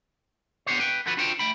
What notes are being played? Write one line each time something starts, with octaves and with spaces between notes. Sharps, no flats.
B3 D4 G4 C5 C#5
B4 G5
D3 F3 F#4 A4 B4
D4 F4 F#4 A4 C5 G5
A3 G5 B5